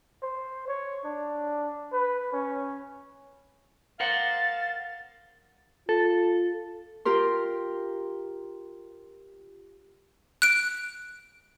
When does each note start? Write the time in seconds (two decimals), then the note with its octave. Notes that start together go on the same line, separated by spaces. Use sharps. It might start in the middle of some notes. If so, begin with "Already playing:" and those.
0.22 C5
0.68 C#5
1.04 D4
1.93 B4
2.33 C#4
4.00 A#4 C5 F5 F#5 A6
5.89 F4 A4
7.05 F4 G4 A#4 C6
10.42 F#6 D7